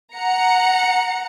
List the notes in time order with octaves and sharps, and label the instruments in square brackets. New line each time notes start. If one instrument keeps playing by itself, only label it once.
[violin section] F#5 A#5 C#7